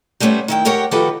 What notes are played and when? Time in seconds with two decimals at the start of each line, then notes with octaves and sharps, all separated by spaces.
0.20 G3 A3 B3 C#4 C5
0.48 D#3 E4 G5
0.65 G#3 G4 A#4 C#5 F#5 G5
0.91 D#3 F3 F#4 G4 A4 B4